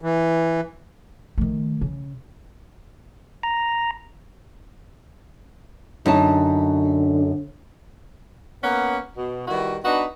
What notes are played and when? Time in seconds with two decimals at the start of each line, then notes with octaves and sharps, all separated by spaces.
0.02 E3
1.38 D#3 A3
1.81 C#3
3.43 A#5
6.06 F#2 D3 D#4 A5
8.63 A#3 B3 C#4 F#5
9.16 B2
9.47 D#3 G3 E4 F#4 B4
9.84 B3 D4 D#4 F#4 B4